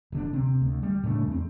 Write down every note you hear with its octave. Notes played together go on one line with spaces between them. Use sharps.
D#1 D3 D4
C3 C4
D2
G3
A2 C#3 A3 D4
E2 C4